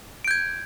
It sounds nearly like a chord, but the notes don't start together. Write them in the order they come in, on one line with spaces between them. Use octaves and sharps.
D7 G6 G#6